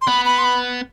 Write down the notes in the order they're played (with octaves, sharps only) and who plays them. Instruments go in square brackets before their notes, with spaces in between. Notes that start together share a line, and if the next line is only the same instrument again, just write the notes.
[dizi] C6
[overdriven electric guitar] B3 [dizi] B5
[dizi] B5
C6
B5